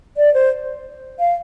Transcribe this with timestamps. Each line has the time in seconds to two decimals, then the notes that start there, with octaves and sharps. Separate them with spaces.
0.17 D5
0.34 C5
1.19 F5